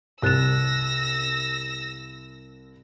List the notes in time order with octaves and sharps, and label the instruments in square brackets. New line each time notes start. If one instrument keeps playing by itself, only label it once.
[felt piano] C2 E7 [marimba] C3 F#6 A6 [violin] E6 A#6